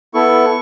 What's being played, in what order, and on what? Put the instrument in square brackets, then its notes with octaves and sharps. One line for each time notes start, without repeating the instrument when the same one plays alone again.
[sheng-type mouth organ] B3 E4 A4 C#6